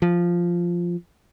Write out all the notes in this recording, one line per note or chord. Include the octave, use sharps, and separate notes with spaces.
F3